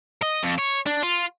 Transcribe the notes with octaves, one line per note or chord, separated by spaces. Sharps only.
D#5
F2
C#5
D4
F4